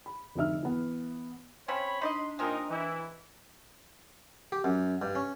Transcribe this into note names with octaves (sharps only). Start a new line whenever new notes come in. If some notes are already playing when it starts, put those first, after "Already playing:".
B5
F1 D3 D#4 E5 F6
E3 B3
C#3 C4 C#5 B5
D4 D#4 D5 D#5 C6
A#2 G#3 C4 D#4 A#4 D#5
E3 E4
G4
F#2
G2
C#4